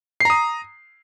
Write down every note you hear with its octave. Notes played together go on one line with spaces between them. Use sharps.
A#5 D#6 C7